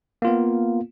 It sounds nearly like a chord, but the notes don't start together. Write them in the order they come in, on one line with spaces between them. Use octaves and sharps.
A#3 F4 B3